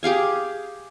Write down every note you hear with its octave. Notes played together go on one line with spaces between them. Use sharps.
G4 G#4 F5 G#5